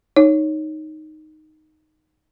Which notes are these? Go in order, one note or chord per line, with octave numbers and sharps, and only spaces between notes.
D#4 C#5